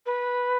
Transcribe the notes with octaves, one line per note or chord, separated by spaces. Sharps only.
B4